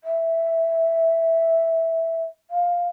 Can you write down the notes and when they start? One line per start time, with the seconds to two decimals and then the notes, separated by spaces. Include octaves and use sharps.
0.04 E5
2.50 F5